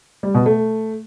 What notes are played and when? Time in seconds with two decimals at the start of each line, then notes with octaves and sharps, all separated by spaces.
0.23 G3
0.35 B2
0.46 A3